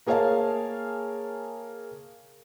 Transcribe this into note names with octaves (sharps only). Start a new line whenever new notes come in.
A#3 G#4 A#4 C#5 F5 A5